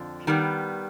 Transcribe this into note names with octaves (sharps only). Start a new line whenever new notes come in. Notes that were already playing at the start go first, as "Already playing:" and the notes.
Already playing: F2 D3 F3
D#3 G3 B3